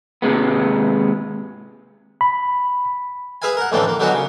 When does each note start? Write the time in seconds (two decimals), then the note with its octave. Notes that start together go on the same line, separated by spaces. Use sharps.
0.22 D#2 G#2 C3 G#3 B3
2.21 B5
3.42 G#4 B4 E5 F5 G#5
3.57 A#4 F#5
3.72 F2 A2 D3 E3 C4 C#4
3.88 A#3
4.00 D3 D#3 F#3 B3 C#4 F#4
4.13 C#3